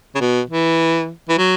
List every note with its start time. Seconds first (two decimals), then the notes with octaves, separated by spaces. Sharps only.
0.15 C#3
0.20 B2
0.50 E3
1.29 E3
1.38 F#3